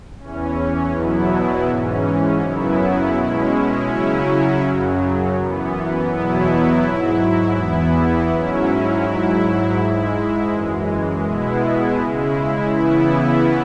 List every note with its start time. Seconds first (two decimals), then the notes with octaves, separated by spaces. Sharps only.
0.20 E2 E3 C#4
0.93 E2 B2 F#3 B3 E4
1.67 G#2 E3 C#4
2.41 F#2 C#3 F#3 B3 E4
3.13 B2 G#3 C#4 E4
3.88 C#3 F#3 C#4 E4
4.61 F#2 C#3 F#3
5.35 F#2 E3 B3
6.08 E2 B2 F#3 B3 E4
6.82 G#2 F#3 E4
7.56 E2 E3 B3 E4
8.30 G#2 F#3 C#4 E4
9.03 G#2 F#3 E4
9.76 G#2 G#3 E4
10.50 F#2 E3 G#3
11.24 B2 G#3 B3 E4
11.98 C#3 G#3 E4
12.71 C#3 E3 B3 E4